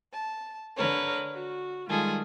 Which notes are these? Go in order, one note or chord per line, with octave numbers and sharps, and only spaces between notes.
A5
D3 A#4 B4 C#5
F#4
D#3 G3 G#3 F4 G#4 A4